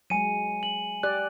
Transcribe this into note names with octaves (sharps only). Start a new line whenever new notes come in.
F#3 G#3 G#5 C#7 D#7
F#7
G4 D5 F#6